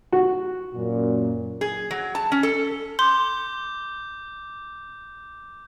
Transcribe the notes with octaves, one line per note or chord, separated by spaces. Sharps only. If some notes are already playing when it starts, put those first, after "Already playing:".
F#4
F#2 A#2
G#4
F#3
A5
C#4
A4
C6 D6 G6